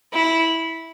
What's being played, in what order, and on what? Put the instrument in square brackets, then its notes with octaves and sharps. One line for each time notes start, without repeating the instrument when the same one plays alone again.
[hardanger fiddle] E4